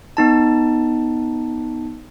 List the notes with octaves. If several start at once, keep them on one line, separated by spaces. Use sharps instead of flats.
B3 D#4 A5